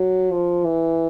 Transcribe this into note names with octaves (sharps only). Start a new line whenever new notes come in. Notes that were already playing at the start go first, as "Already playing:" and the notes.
Already playing: F#3
F3
E3